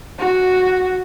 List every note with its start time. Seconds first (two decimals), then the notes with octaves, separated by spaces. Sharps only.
0.19 F#4